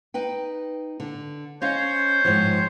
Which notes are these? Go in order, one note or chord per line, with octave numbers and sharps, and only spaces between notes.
D#4 B4 G5
D3
C#4 C5 C#5 D#5 F5 G6
G#2 D#3 F3